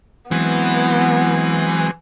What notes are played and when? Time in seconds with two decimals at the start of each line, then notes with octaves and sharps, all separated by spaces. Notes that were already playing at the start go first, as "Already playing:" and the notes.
0.31 E3 F#3 G#3 B3 C4